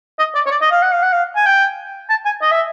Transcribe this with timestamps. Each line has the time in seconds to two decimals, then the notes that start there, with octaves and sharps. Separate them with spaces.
0.19 D#5
0.35 D5
0.46 C#5
0.51 D5
0.61 D#5
0.71 F5
0.82 F#5
0.92 F5
1.02 F#5
1.12 F5
1.36 G#5
1.46 G5
2.10 A5
2.25 G#5
2.42 D#5
2.51 E5